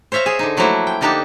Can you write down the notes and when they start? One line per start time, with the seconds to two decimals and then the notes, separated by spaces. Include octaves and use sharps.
0.12 C5 C#5 E5 F5 A#5
0.26 G#4
0.39 D3 D#4
0.57 F3 F#3 A3 A#3 E4 F#4
0.87 G5
1.01 D3 A#3 D#4 G4 F#5 A5